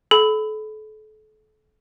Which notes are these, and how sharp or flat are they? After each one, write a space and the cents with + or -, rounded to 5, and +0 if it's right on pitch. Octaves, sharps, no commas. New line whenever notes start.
A4 -35 B5 +20